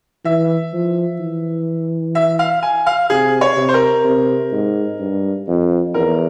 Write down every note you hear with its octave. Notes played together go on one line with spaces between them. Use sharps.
E3 E5
F3
E3
E5
F5
G#5
F5
C3 G#4
C#5
C3
C5
A#4
C3
G#2
G2
F2
E2 A#4